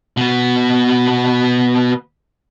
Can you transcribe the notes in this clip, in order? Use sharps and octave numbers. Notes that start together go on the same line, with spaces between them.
B2 B3